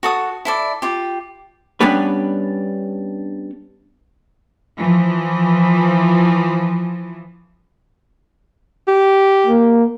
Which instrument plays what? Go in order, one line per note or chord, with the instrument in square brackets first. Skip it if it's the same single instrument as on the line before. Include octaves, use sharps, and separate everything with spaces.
[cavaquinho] F#4 A4 D#6
E4 A4 D5
F4 G4
[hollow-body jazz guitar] G3 B3 C#4 D4 G4 B4
[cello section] E3 F3
[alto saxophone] G4
[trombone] A#3